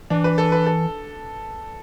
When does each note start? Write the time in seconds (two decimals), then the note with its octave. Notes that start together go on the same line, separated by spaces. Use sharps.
0.10 E3 D4
0.24 B4
0.38 A4
0.52 B4
0.66 A4